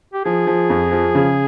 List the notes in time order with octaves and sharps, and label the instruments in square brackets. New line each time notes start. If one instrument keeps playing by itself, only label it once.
[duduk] G4
[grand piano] F3 [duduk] G#4
[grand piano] F3
F2
F3
C#3